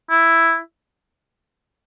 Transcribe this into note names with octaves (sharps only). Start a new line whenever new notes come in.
E4